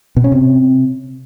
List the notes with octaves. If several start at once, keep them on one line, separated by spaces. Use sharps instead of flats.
B2
C#4
C3